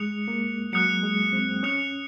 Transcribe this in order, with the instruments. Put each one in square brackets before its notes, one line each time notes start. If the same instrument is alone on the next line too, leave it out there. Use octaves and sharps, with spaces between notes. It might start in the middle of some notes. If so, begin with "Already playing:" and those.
Already playing: [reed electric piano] G#3 [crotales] D#6 F#6 C#7 F7
[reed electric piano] A#3
[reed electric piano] F#3 [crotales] D#6 F#6 C#7 F7
[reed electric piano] G#3
C4
[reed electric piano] C#4 [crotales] D#6 F#6 C#7 F7